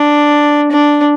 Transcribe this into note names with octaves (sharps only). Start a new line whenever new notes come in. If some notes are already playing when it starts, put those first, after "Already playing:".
Already playing: D4
D4